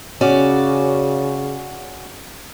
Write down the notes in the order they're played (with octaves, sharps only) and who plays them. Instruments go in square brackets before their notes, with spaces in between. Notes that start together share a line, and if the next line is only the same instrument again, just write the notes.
[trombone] C#3 [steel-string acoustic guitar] C#4 F#4 D5